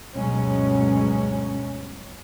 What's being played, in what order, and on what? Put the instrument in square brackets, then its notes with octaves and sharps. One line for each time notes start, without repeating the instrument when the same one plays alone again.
[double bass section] D2 G2 B2 F#3 G#3 C#4